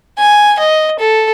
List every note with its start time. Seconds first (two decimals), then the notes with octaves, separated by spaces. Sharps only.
0.18 G#5
0.59 D#5
0.99 A4